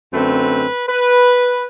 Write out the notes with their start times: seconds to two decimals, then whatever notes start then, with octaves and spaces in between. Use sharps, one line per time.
0.13 F#2 D3 A3 C4 B4
0.87 B4